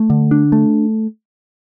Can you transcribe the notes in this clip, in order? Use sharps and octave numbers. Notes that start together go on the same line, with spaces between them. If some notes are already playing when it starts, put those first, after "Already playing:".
Already playing: A3
D3
D4
A3